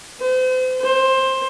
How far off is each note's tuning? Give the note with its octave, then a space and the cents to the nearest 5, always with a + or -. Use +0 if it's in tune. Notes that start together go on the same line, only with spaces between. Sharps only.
C5 -35
C5 +15